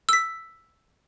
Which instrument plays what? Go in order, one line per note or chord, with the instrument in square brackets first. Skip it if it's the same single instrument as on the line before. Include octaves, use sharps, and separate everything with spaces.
[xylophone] E6 B6